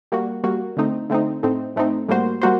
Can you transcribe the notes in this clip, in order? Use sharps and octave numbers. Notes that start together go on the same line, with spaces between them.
G3 A#3 F#4
G3 A#3 F#4
D3 A3 C4 D#4
D3 A3 C4 D#4
A2 A3 C4 D#4
A2 A3 C4 D#4
A2 G3 A#3 F#4 C5
G3 A#3 F#4 C5